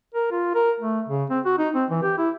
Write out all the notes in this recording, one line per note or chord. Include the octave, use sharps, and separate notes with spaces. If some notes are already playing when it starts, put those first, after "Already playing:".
A#4
F4
A#4
A3
C#3
C4
F#4
D#4
C4
E3
G4
E4